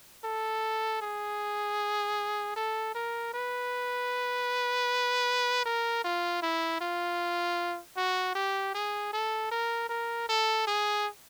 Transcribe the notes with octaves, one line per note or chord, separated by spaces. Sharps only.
A4
G#4
A4
A#4
B4
A#4
F4
E4
F4
F#4
G4
G#4
A4
A#4
A#4
A4
G#4